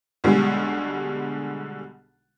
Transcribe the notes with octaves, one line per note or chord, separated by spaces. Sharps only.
B1 B2 D3 G3 G#3